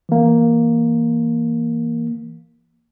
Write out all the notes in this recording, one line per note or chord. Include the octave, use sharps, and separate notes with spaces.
E3 A#3